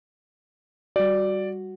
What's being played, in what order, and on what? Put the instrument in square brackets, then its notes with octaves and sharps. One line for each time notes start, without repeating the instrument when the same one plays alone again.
[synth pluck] G3 F#4 [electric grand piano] D5